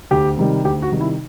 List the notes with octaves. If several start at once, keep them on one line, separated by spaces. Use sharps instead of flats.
D2 G4
C3 D#3 G3
D2 G4
F#4
C3 D#3 G3
E4